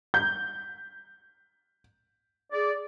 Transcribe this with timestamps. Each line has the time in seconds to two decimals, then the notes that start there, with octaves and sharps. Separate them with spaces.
0.14 G6
2.52 G#4 D5